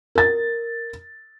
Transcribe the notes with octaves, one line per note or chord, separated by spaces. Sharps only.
A#4 A6